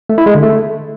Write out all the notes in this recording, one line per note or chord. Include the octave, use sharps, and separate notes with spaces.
A3
E4
G#3
D3
A3